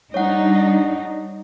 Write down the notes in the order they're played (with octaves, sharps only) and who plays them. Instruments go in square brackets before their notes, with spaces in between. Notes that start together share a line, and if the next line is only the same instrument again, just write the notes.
[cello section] G3 D4 D#4 [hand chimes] C#5 F#5